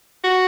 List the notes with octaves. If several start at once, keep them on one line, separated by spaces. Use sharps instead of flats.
F#4